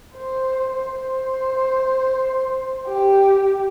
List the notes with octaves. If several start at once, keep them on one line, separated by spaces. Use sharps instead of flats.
C5
C5
G4